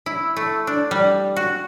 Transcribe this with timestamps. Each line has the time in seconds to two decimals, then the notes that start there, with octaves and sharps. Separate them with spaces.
0.06 E4
0.37 A3
0.67 D4
0.91 G3
1.36 F#4